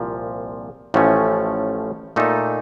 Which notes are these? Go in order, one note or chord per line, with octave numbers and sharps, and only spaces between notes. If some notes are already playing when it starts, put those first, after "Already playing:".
Already playing: C2 A#2 F3
A1 A2 F3 A3 C#4
A#2 A3 D#4 A4